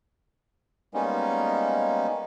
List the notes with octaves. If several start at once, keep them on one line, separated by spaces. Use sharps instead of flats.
G3 G#3 A#3 B3 C#4 D#4